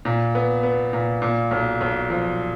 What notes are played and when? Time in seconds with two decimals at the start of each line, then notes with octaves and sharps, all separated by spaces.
0.05 A#2
0.35 B3
0.63 B3
0.93 A#2
1.22 A#2
1.51 B1
1.81 B1
2.10 F3